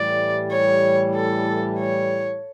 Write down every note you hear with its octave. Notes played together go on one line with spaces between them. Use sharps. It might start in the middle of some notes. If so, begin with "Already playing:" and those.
Already playing: A2 E3 G3 D5
C#5
A4
C#5